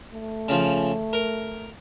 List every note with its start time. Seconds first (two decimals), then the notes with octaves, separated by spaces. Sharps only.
0.12 A3
0.49 C#3 F3
1.13 A#4